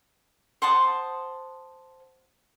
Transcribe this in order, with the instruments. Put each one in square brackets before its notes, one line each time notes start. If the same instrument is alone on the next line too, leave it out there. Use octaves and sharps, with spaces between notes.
[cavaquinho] C5 F#5 A5 D#6